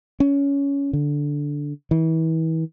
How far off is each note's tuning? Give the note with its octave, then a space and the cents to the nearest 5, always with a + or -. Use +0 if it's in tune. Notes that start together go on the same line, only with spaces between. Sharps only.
C#4 +15
D3 -10
E3 -35